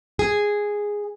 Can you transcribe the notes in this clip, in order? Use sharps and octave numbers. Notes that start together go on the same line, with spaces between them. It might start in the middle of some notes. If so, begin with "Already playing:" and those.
G#4